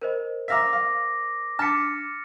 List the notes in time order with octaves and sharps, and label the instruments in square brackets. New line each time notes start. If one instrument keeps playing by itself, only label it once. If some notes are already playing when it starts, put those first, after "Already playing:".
[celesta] A#4 C5 D#5
[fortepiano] E5 F5 A#5 [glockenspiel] D6 A#6 B6
[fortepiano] F5
[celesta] D4 D6 B6 [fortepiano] A5 [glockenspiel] F6 A6 C#7